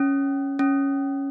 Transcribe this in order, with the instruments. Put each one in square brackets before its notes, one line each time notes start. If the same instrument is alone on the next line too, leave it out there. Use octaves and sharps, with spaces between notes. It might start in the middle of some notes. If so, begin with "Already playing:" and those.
Already playing: [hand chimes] C#4
C#4